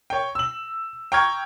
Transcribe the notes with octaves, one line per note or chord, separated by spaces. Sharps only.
C#5 G5
E6 F#7
G5 A#5 C#6 F6 G#6